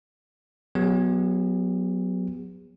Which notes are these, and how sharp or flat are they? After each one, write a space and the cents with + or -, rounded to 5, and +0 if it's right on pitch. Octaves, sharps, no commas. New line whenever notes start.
F#3 +0 B3 +0 G#4 -45